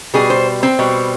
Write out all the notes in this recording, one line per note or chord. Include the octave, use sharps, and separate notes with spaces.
B2 G3 G#4
C5
C4
B2 G3